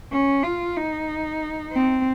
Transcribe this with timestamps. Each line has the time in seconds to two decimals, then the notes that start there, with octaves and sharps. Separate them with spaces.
0.12 C#4
0.43 F4
0.77 D#4
1.73 C4